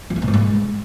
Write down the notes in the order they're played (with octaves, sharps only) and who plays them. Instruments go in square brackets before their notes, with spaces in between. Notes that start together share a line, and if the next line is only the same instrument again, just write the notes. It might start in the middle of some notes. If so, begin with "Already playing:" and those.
[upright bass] F3
E3
B2
G#2
G#3